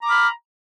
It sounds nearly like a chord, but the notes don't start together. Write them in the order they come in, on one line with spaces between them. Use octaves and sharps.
A#5 D6 B5 F6